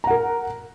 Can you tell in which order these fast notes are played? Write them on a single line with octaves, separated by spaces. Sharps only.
A#5 F#5 A#4